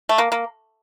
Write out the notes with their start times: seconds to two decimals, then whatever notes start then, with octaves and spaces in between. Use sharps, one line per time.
0.09 A3
0.18 A#3
0.32 A#3